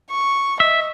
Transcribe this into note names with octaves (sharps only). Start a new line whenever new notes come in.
C#6
D#5 E5